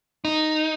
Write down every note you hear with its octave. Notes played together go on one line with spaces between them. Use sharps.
D#4